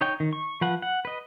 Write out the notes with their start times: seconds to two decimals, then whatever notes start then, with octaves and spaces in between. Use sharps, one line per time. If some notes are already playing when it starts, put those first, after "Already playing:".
0.01 D#4 C#5 G5
0.20 D#3
0.33 C#6
0.61 F3 B4 F#5
0.82 F#5
1.05 B4 D#5